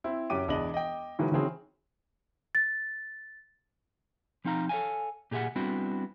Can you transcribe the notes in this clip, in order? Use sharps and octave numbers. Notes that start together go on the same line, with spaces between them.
C4 E4
F#2 C#4 G4 D6 D#7
E1 E2 D4 D#5 F#7
D#5 G5
D#3 E3 F#3 G#3
D#3 E3 F#3 C4 C#4 G#4
A6
F3 C4 D#4 F5 A#5
A4 C#5 D#5 F5 G#5
A#2 G4 G#4 E5 F#5
G3 B3 C4 D4 E4 F#4